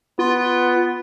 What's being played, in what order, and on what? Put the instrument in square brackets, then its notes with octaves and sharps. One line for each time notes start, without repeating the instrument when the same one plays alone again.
[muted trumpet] B3 [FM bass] F4